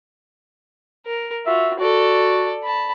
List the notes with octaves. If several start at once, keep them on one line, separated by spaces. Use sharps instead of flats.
A#4
F4 F#4 E5
F#4 A4 D5
A5 B5